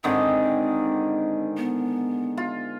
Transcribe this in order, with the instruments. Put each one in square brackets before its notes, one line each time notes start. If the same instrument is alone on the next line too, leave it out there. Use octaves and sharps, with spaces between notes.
[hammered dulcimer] G#2 D3 D#3 [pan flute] C4
[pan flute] B3
[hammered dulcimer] F4